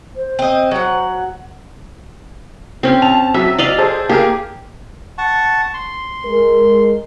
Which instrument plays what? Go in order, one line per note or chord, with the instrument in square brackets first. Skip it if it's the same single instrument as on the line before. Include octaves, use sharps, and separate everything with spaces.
[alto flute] C5
[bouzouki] C4 D#5
F#3 F#5
[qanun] C4 C#4
[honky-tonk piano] A5 F7
[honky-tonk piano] F#3 E6 B6 [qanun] E5
[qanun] D5 D#5 F5
[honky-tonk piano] G#4 A4 C5
[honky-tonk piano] A#3 G#4 A#4 [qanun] G4
[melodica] F#5 A5 C#6
C6
[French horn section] G#3 A#4